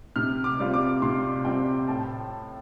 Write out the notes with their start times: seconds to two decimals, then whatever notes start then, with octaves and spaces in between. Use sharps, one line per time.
0.16 C3 F6
0.44 D6
0.60 G3 C4 F4
0.74 D6
1.02 C3 C6
1.45 G3 C4 F4 G5
1.88 A2 A5